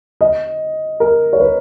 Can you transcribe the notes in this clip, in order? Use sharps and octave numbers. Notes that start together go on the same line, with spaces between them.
D#5
A#4
C#5
B4